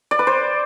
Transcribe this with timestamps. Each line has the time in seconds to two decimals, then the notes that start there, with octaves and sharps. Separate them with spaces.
0.11 D5
0.19 B4
0.27 C5